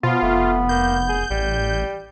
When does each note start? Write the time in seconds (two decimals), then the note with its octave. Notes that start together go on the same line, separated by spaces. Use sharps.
0.03 B2 F3 B3 F4
0.22 F1 A3
0.69 A#3 G6
1.08 G#4
1.30 A1 G3